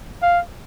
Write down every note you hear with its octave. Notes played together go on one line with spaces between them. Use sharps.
F5